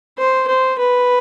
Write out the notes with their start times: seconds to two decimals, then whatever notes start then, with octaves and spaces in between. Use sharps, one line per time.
0.18 C5
0.48 C5
0.79 B4